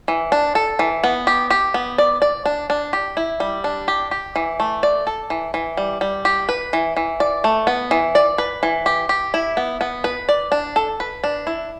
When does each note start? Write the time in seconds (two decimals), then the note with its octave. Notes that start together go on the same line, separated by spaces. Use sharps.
0.08 E3
0.32 D4
0.55 A4
0.79 E3
1.04 B3
1.27 G4
1.50 G4
1.74 B3
1.98 D5
2.22 D5
2.46 D4
2.70 D4
2.93 G4
3.17 E4
3.40 G3
3.64 D4
3.88 G4
4.11 G4
4.36 E3
4.60 A3
4.83 D5
5.07 A4
5.30 E3
5.54 E3
5.77 G3
6.01 G3
6.25 G4
6.49 B4
6.73 E3
6.97 E3
7.20 D5
7.44 A3
7.67 B3
7.91 E3
8.15 D5
8.38 B4
8.63 E3
8.86 G4
9.09 G4
9.34 E4
9.57 B3
9.81 B3
10.04 B4
10.29 D5
10.52 D4
10.76 A4
11.00 B4
11.24 D4
11.47 E4